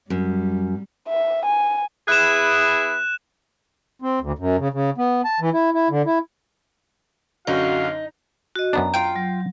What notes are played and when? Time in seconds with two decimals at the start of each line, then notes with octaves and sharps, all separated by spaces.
0.10 F#2 G3
1.08 E5
1.45 G#5
2.08 B3 E4 G#4 F#6 E7
4.02 C4
4.21 D2
4.39 F#2
4.59 C#3
4.73 C#3
4.98 B3
5.25 A5
5.40 E3
5.53 E4
5.74 E4
5.90 D3
6.06 E4
7.47 F#2 D3 C#4 D#4 F#4 F5
8.56 F#4 D#5
8.73 F#2 B3 D4 A#5
8.94 F4 G5
9.16 F#3